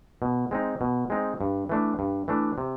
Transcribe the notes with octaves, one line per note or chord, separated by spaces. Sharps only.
B2
G#3 C4 D#4
B2
G#3 C4 D#4
G2
E3 A3 D4
G2
E3 A3 D4
C3